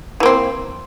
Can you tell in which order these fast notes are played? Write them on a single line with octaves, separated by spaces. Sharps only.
E3 A#3 C4